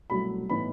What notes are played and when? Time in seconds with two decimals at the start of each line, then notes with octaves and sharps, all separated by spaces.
0.10 C2 B2 F#3 A3 B5
0.49 A2 E3 B3 D#4 B5